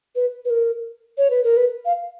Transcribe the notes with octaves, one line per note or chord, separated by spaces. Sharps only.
B4
B4
A#4
C#5
B4
A#4
B4
F5